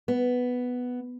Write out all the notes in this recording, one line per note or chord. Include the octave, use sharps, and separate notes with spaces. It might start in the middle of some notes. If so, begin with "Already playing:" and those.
B3